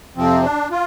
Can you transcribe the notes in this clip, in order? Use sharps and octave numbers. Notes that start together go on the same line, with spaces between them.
F2 C3 F3 C4
D4
F4